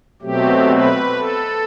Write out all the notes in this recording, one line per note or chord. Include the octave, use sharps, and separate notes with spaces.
B2 F#3 A3 C4 G4
B4
A4